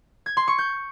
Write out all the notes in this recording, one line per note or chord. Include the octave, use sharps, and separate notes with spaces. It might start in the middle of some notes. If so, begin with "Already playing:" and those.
G#6
C6
C#6
G6